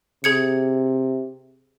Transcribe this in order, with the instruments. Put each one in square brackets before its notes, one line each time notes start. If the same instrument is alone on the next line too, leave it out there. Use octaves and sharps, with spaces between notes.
[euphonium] C3 [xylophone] G#4 G#6 C#7